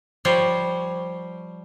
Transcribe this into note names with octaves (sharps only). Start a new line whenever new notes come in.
F3 G3 C5 C#5